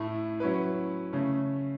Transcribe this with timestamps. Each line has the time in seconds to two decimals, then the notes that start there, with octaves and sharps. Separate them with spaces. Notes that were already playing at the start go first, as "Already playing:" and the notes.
Already playing: A2 A3 E4
0.40 F#3 C#4 E4 B4
1.13 C#3 A3 C#4